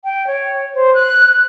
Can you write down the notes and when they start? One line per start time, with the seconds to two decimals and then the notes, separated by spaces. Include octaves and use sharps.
0.04 G5
0.27 C#5
0.75 C5
0.94 F#6